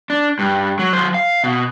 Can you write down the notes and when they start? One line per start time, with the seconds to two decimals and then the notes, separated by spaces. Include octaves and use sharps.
0.10 D4
0.39 G2
0.79 F#3
0.93 F#3 C5
1.14 F5
1.44 B2